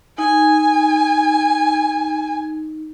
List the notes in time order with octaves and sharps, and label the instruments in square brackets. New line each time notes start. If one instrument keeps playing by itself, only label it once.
[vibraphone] D#4 [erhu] G#5